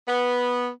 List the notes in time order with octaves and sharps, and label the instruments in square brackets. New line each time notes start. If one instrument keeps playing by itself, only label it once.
[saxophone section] B3